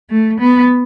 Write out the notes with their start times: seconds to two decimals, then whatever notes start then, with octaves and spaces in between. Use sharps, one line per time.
0.10 A3
0.40 B3